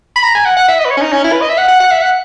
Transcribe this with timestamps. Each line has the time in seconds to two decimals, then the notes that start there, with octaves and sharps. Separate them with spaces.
0.16 B5
0.23 A#5
0.35 G#5
0.46 F#5
0.57 F#5
0.68 E5
0.79 D#5
0.85 B4
0.91 C#5
0.97 C#4
1.02 D#4
1.13 C#4
1.24 E4
1.32 B4
1.41 D#5
1.50 E5
1.58 F#5
1.68 F#5
1.80 F#5
1.91 E5
2.02 F#5